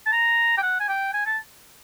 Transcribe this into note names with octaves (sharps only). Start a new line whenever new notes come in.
A5
A#5
G5
F#5
G#5
G5
G#5
A5